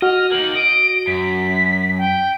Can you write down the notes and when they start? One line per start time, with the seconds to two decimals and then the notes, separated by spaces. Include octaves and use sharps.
0.02 F#4 D#5 F6
0.31 A#3 D#4 F#7
0.55 D#5 D7
1.07 F#2 B6
1.98 G5